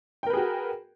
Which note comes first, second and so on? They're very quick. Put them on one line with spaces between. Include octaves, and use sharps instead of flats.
G5 A#4 B4 G#4 F#4